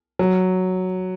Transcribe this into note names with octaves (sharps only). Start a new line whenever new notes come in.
F#3